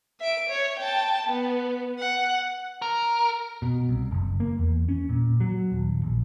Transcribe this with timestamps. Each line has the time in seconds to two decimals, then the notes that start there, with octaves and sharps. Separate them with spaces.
0.20 E5 D7
0.50 C#5
0.79 G5 A5
1.27 B3
1.99 F#5
2.82 A#4
3.62 B2
3.89 C2
4.11 F#1
4.40 A#3
4.59 E2
4.89 C#4
5.09 A#2
5.40 F#3
5.72 D#1
6.03 A#1